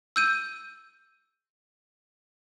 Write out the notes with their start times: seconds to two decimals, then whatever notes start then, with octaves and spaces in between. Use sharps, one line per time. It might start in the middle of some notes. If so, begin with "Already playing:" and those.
0.16 E6 G6 D#7